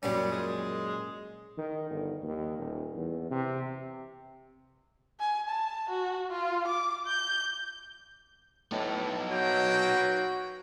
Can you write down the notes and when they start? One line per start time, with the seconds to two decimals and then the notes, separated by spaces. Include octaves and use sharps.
0.03 F#2 A#2 G3 C#4
0.32 G#3
1.57 D#3
1.90 G1
2.23 D#2
2.59 D#1
2.95 E2
3.30 C3
5.20 G#5
5.49 A5
5.90 F#4
6.31 F4
6.68 D6
7.07 G6
8.72 A2 B3 D#4
9.30 F#3 A#3 F#4 G5